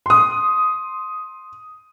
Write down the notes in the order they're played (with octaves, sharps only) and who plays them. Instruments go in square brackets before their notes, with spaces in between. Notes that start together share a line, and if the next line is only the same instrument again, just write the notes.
[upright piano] C6 D#6